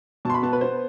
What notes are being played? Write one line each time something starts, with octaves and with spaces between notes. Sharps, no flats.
B2 A5 C6
B5
B3 A5
B4
B3 C5